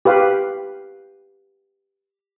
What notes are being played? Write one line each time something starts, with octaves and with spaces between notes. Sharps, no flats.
G4 B4 F5